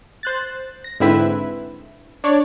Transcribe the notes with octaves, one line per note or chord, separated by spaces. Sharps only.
C5 F#6 A6
A#6
G#2 D3 C4 E4 B4 E5
D4 C#5 D5